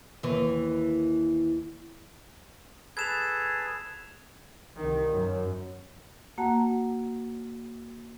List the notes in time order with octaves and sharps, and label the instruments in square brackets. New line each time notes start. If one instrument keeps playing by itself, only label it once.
[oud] D#2 E3
[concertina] G#4 A4 B4 [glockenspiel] G#6 E7 F7
[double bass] C2 D#3
F#2
[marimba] A#3 F#4 F#5 A5 A#5